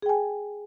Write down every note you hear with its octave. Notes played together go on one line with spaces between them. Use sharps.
G#4 G5 G#5